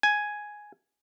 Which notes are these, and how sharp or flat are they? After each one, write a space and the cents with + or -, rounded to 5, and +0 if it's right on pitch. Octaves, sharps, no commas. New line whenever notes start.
G#5 +5